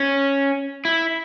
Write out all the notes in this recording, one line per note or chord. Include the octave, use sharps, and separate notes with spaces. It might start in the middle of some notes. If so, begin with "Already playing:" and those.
Already playing: C#4
E4